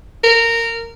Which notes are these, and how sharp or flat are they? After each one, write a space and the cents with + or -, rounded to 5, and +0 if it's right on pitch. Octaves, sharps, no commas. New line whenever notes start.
A#4 -15